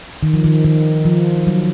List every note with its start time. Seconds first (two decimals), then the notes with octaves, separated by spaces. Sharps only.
0.23 D#3
0.34 F3
0.44 D#3
0.64 D#3
1.05 F3
1.47 F#3